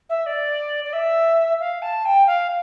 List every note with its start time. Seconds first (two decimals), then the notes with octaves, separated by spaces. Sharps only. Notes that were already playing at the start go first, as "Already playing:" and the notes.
0.09 E5
0.26 D5
0.84 D5
0.93 E5
1.60 F5
1.82 A5
2.05 G5
2.27 F5